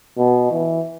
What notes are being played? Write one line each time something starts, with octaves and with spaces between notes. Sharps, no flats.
B2
E3